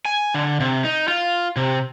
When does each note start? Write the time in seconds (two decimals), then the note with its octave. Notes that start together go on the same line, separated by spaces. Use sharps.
0.05 G#5
0.34 D3
0.60 C3
0.84 D#4
1.08 F4
1.57 C3